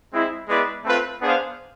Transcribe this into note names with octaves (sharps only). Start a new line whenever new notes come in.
G#3 C4 E4
G#3 B3 E4 B4 D5
A3 C4 F4 B4
B3 D4 G#4 C5 F5